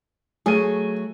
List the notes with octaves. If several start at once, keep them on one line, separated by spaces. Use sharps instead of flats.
F#3 A3 G#4 D#7